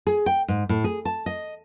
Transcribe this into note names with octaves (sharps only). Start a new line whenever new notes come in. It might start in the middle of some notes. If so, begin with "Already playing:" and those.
G#4
G5
G#2
A2
G#4
A5
D#5